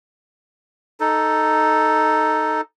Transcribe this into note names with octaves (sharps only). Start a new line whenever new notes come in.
D#4 A4